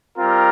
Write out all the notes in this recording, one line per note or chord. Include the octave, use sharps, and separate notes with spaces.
G3 C4 F4 A#4